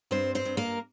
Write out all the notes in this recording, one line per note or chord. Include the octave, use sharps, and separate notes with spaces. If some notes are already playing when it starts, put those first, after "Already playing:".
G2 C4 C5
C4 C5
G2
A#3 A#4